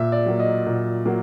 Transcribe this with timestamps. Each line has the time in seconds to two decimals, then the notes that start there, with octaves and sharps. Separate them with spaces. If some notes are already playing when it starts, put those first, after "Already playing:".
Already playing: A#2 E5
0.12 D5
0.26 F#3 A#3
0.40 D#5
0.66 A#2
1.06 F#3 A#3